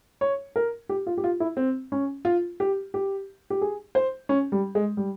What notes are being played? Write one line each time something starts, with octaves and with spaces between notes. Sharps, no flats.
C#5
A#4
G4
F4
G4
F4
E4
C4
C#4
F4
G4
G4
G4
G#4
C5
C#4
G3
G#3
G3